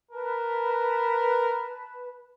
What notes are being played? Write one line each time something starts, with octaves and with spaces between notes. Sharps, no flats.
A#4 B4 A5